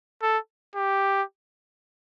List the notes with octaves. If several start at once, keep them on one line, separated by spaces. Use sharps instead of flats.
A4
G4